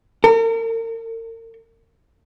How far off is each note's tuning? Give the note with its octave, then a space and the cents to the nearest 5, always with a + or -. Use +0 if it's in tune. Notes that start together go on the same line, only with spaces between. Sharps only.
A#4 -40